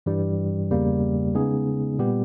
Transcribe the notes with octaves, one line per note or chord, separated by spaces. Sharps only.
G2 E3 G3
E2 C#3 G3 A#3
C#3 G#3 B3 D#4 G#4
A#2 G3 B3 G4